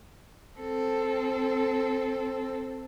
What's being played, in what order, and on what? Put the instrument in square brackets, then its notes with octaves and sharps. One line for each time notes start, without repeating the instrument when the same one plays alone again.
[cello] C4 A4